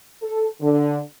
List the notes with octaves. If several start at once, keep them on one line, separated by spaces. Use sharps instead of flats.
A4
D3